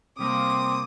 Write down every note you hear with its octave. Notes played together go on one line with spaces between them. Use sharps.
C3 G3 A#3 C4 D6 D#6